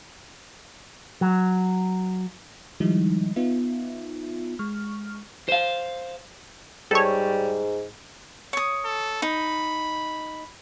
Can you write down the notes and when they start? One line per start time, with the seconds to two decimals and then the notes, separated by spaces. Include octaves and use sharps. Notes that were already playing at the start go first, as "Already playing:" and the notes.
1.21 F#3
2.80 D#3 F3 G3 G#3 D#4 E4
3.36 B3 D#4 F4 E5
4.59 G#3 C#6 F6
5.49 C5 F5
6.91 G#2 G3 A4 C#5
8.53 C#5 D#6
8.85 A4
9.22 D#4 B5